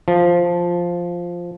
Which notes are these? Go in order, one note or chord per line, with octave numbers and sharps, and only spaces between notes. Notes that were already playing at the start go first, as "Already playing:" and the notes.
F3